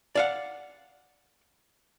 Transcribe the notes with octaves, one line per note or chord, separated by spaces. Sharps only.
D5 F5 F#5